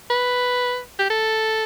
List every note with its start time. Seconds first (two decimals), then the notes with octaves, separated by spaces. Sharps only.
0.10 B4
0.99 G4
1.10 A4